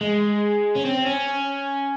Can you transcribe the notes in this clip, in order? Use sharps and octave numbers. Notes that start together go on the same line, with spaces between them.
G#3
C#4
C4
C#4